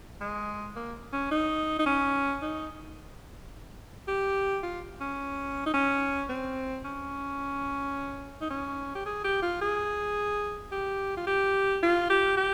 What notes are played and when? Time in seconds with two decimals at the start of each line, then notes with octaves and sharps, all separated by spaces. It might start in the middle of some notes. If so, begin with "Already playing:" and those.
0.21 G#3
0.76 A#3
1.13 C#4
1.31 D#4
1.79 D#4
1.86 C#4
2.42 D#4
4.08 G4
4.63 F4
5.00 C#4
5.66 D#4
5.74 C#4
6.29 C4
6.85 C#4
8.41 D#4
8.50 C#4
8.95 G4
9.06 G#4
9.24 G4
9.42 F4
9.61 G#4
10.72 G4
11.17 F4
11.27 G4
11.83 F4
12.10 G4
12.37 G4